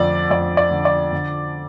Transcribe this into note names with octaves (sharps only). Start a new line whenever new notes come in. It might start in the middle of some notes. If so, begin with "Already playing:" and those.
Already playing: F2 D3 D5
F2 D5
D5
D3
D5
D3